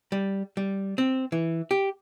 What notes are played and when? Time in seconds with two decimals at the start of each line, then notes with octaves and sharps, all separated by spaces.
0.12 G3
0.57 G3
0.98 C4
1.32 E3
1.71 G4